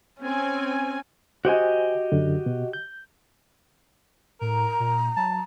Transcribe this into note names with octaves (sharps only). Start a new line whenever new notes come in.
C4 C#4 G#5
F#4 G4 C5 D#5 G#5
F#2 D3
B2
G6
A2 A#4 A#5
A#2
F#3 A5